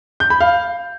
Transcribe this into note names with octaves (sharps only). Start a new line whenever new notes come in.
G6
B5
F5